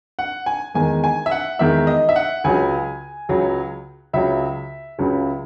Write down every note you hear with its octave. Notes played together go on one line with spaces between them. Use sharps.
F#5
G#5
E2 D#3 G#3 G#5
G#5
E5
F#5
E2 D#3 G#3 E5
D#5
E5
F#5
C#2 C#3 F#3 G#5
C#2 C#3 F#3
C#2 C#3 F#3 E5
C#2 C#3 F#3